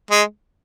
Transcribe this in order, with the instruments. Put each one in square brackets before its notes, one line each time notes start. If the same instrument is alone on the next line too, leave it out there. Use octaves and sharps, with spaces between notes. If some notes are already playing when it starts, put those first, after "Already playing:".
[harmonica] G#3